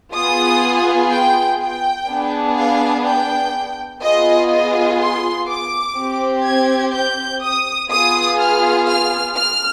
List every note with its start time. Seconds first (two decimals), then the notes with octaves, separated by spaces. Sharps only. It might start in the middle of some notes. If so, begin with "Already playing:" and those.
0.13 B3 F4 G#4 D#6
1.11 G5
1.60 G5
2.08 B3 D4 G#4
2.57 F5
3.06 G5
4.01 B3 F4 G#4 D#5
4.51 D#5
4.99 C6
5.48 D6
5.96 C4 G4
6.45 G#6
6.93 G6
7.42 D#6
7.90 B3 F4 G#4 D#6
8.38 F6
8.88 F6
9.36 F6